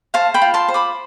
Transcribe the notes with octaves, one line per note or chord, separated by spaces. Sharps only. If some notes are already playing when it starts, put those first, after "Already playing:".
C5 F5 A5
G5 B5
F4
A5 C6
C5
B5 D6